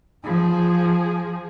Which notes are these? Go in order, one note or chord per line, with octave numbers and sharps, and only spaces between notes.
F3 G#4